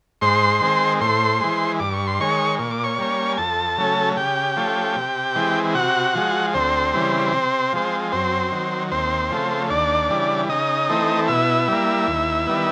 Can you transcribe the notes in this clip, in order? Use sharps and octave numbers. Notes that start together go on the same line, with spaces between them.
G#2 C5 C6
D#3 G#3 C4
A2 C5 C6
E3 G#3
G2 D6
C#6
C6
D#3 G#3 C#5 C#6
A#2 C#6
D6
C#5 C#6
G3 A#3 C#4
G#5
F2 A4 A5
C#3 F#3 A3 C#4
C#3 G4 G5
F3 A3 C#4
C3
E3 G#3 C4
C3 F#4 F#5
F3 G#3
D2 C4 C5
C#3 E3 G3
C3
F3 G#3 C4
F#2 C4 C5
D#3 F#3
D#2 C4 C5
C#3 F3 A3
D#2 D4 D5
C#3 E3 G3
C#3 D#4 D#5
E3 A3 C4
B2 E4 E5
G3 A#3
D#2
D#3 G3 B3